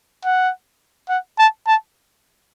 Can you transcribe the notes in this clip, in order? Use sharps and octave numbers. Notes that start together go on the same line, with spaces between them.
F#5
F#5
A5
A5